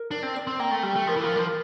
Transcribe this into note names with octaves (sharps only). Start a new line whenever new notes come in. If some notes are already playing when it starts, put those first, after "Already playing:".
Already playing: A#4
D4 D5
C4
D5
C4
A#3 G5
A3
G3 G5
A3
F3 A#4
E3
F3
G3 A#4
F3